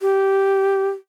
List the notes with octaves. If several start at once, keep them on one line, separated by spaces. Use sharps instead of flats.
G4